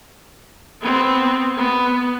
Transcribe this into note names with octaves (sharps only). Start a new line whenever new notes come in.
B3 C4
B3